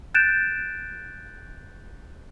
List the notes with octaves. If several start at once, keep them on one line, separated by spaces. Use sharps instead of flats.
F#6 G6 A6 D7 E7